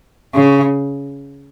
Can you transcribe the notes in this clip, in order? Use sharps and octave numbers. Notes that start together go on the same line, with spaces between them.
C#3